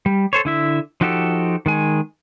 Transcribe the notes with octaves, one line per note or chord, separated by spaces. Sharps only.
G3
A4 C5 C#5
D3 E4 E5
F3 D#4 F#4 G4 A4
D#3 G#3 G#5